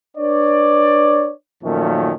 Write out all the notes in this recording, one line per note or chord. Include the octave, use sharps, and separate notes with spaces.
D4 B4 C#5 D5
F#2 A#2 D#3 F3 A3 C#4